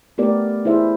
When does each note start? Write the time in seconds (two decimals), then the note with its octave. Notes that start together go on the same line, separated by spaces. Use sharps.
0.18 A3 B3 G4 A#4 D5
0.65 E4 G#4 C5 E5